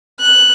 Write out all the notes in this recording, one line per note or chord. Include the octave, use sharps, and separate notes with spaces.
F#6